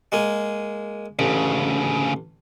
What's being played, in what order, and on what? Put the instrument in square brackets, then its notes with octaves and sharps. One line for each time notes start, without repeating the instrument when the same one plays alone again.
[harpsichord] G#3 A#3 G#4
[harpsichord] A1 [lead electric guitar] D2 C#3